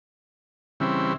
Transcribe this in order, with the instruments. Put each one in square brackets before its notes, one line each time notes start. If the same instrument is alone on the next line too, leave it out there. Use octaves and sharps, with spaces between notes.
[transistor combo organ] C#3 E3 G3 C4 E4